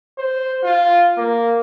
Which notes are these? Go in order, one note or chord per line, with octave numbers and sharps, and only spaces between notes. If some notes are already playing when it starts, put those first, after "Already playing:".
C5
F4
A#3